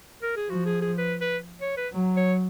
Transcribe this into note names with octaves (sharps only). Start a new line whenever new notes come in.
A#4
G#4
F3 F#4
G#4
G#4
B4
B4
C#5
B4
F#3
C#5